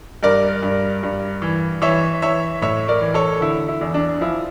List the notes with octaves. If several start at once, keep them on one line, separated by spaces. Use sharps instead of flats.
G2 A#4 D5
G2
G2
E3
E3 C#5 E5
E3 C#5 E5
A2 C#5 E5
A#4 D5
E3
A4 C#5
D3 E4
E4
E2
D4
F3 E4